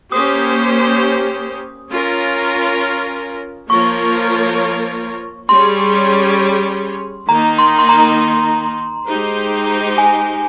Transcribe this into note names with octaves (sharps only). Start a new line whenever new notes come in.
A#3 C#4 G4 C5 D#6
C#4 F4 A#4
F3 A#3 F4 A#4 C#5 C#6
G3 C#4 G#4 C#5 C6
D#3 A#3 D#4 A#5
C6
C6
A#5
G#3 D#4 G4 C5
G#5